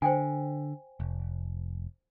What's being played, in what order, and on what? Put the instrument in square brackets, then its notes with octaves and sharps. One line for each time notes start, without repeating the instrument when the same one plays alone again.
[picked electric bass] D3 [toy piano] C5 G5 G#5
[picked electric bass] F1